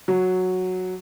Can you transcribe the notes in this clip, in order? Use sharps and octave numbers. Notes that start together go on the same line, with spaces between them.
F#3